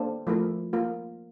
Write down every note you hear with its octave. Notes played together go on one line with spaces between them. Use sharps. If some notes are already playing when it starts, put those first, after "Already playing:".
Already playing: A#3 D4 A4 C5
F3 A3 E4 A#4
A#3 F4 A#4